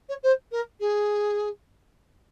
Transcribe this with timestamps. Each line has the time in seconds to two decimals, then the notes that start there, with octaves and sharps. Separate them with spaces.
0.09 C#5
0.23 C5
0.51 A#4
0.80 G#4